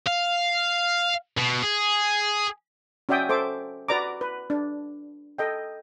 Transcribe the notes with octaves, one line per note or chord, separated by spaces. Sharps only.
F5
B2
G#4
C#4 F#4 D5 E5 G5 D#6
A4 C5 E5 D6
F#4 B4 D5 A#5 D6
B4
D4
A4 D#5 G5